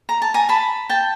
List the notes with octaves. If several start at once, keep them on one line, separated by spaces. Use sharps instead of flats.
A#5
A5
G#5 A#5
A5 B5
G5 A5